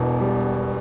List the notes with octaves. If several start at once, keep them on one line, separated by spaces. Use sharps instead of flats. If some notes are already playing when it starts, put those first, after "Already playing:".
Already playing: E1 E2 B2
G3